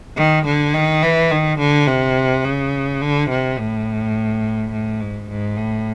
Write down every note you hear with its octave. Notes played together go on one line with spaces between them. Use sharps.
D#3
D3
D#3
E3
D#3
D3
C3
C#3
D3
C3
A2
A2
G#2
G#2
A2